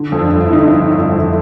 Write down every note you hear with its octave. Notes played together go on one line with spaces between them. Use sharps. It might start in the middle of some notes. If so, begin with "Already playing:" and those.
Already playing: D3
F2
D4
G1
E4
D3 D#4
D4
G1 D#4
G1
F2